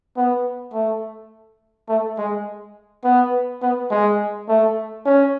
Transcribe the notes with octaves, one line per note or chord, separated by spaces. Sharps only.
B3
A3
A3
G#3
B3
B3
G#3
A3
C#4